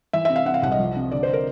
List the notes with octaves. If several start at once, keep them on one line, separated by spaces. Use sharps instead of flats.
E3 E5
C3 E5
F5
C3 F#5
F5
C2 F#5
D#5
F3
C3
D3 D5
C5
A#4